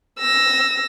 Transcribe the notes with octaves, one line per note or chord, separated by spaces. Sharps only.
E6 A#6